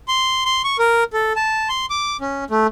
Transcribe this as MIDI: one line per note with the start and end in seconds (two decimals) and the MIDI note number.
0.08 0.45 84
0.45 0.62 84
0.64 0.77 85
0.79 1.04 70
1.13 1.33 69
1.36 1.69 81
1.69 1.86 84
1.90 2.17 86
2.21 2.44 61
2.50 2.67 57